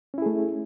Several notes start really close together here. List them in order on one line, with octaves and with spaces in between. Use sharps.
C#4 E4 G#4 A3